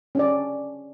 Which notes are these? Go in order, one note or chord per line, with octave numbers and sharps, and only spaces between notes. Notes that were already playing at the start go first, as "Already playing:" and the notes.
C#4 D4 D5